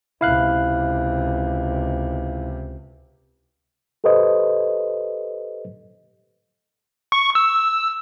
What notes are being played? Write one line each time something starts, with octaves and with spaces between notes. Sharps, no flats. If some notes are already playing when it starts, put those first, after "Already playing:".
C#2 C3 E4 F5 F#6
G4 A4 B4 C5 D#5
C#6
E6